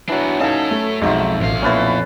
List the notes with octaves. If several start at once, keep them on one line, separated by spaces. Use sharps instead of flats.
E3 F#3 B3 D4
F#3 C#4 D#4 A4 C#5 F5 A5
A3
B1 F2 G#3 D#4 F#4 E5
A1 F2 F5
A#2 B3 C#4 E4 B4 A5